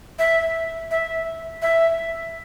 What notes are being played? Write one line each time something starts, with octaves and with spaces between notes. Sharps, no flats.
E5
E5
E5